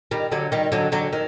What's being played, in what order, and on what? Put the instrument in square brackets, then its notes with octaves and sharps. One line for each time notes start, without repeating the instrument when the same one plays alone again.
[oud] D#3 G3
D3 F#3
D#3 G3
D3 F#3
D3 F#3
D#3